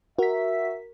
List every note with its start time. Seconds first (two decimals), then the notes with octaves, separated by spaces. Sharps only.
0.19 F#4 A#4 E5 B6